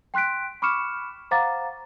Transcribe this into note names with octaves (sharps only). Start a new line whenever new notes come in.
G5 C6 F#6 B6 D7
B5 C#6 D6 F6 C#7 E7
C5 F5 F#5 A#5 D6 A6